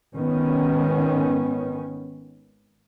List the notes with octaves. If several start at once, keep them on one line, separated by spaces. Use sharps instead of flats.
G#1 D#3 B3 C#4